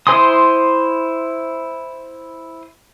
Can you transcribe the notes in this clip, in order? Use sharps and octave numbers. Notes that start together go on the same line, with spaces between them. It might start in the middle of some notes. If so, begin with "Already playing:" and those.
E4 C5 G#5 C6 D#6